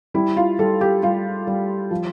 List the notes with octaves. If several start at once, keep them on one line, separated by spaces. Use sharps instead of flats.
G3 E4
F4
G3 A4
G4
G3 F4
G3
F3